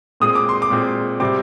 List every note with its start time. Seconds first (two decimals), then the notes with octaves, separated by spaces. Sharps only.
0.20 A#2 G#3 C4 D#6
0.35 D6
0.49 C6
0.62 D6
0.70 A#2 G#3 C4
1.20 C3 G3 C4 D6